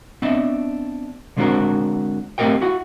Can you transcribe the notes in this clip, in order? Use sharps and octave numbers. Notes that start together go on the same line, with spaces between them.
B3 C4 D4 D#5 E5
D3 G#3 C4 D4 F#4 A#4
A3 C4 G4 A#4 D#5 G5
E4 F#4 F#5